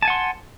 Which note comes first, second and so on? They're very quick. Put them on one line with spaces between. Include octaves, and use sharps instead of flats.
A5 G#5 F#5 C6